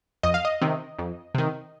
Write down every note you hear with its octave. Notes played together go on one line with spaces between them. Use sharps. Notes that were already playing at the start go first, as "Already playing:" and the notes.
F2 D#5
F5
D#5
C3 D#3
F2
C3 D#3